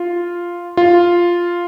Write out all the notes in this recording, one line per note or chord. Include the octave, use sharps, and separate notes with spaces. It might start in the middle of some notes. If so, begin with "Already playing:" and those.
Already playing: F4
F4